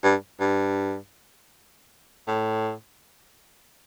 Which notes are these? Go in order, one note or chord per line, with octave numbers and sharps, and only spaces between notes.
G2
G2
A2